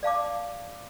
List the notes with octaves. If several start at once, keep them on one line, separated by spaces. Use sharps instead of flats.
D5 F5 A5 D6